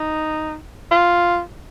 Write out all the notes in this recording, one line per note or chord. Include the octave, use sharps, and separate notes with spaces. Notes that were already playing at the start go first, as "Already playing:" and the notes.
Already playing: D#4
F4